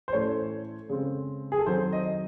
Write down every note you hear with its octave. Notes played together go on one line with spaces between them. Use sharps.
C5
A2 E3 A3 C#4 C#5
C#3 G#3 C4
G#4
A4
D#3 F#3 C4 C5
D#5